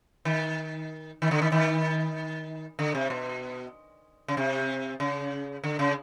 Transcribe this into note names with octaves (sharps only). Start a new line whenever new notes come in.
D#3
D#3
D3
D#3
D#3
D3
C3
B2
C#3
C3
C#3
D3
C#3